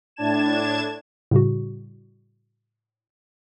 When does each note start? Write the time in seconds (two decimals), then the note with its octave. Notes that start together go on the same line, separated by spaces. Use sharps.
0.16 A2 D4 A5 G#6 E7
1.31 A2 C#3 G3 F#4